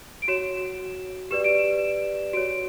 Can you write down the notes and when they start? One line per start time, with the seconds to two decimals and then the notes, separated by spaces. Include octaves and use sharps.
0.22 D7
0.28 F#4 C#5 E7
1.31 G4 B4 D5 E7
1.44 D7
1.59 E7
2.33 F#4 C#5 D7